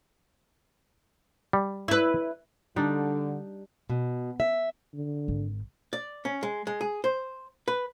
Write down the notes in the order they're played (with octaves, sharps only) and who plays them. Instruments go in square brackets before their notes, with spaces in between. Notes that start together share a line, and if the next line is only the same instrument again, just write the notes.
[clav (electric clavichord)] G3
[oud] E4 B4
[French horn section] D3 [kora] G3 D4 D#4
[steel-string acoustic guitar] B2
E5
[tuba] D3
[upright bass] G#1
[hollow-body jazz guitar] D5
C#4
G#3
G#3
G#4
C5
B4